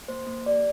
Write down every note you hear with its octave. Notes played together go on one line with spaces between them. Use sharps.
A#3 C5
A#3
G4 D5